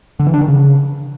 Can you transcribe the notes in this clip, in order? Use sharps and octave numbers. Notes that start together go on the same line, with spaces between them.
D3
E3
D4
D#3
C#3